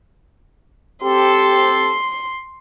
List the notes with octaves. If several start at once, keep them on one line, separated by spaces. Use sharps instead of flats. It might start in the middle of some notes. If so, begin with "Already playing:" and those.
C4 G4 A4 C6